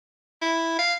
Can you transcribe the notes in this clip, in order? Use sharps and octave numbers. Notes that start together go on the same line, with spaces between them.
E4
F5